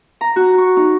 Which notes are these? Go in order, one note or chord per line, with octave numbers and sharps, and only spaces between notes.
A#5
F#4
C#6
D#4